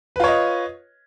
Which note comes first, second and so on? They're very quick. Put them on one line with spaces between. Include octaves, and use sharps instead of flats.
B4 F4 C#5 D#5